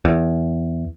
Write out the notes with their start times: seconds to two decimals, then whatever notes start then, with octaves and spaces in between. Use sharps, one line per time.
0.05 E2